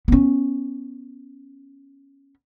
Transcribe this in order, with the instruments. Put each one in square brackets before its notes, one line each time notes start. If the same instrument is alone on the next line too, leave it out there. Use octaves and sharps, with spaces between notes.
[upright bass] B3 C#4